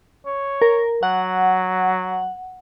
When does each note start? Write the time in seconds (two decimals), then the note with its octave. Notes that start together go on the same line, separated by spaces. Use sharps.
0.26 C#5
0.62 A#4
1.03 F#3 F#5